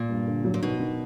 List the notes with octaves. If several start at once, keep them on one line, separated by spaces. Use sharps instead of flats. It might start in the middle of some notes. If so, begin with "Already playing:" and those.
Already playing: A#2
G2
D3
F#3
A#2
B2 D#3
D#3